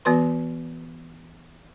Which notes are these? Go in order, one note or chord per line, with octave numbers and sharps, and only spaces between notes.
E3 B3 F#4 B4 C6